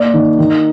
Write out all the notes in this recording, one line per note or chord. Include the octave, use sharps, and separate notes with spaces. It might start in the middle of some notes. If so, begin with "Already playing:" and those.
Already playing: A#3 D5
D#3
D#3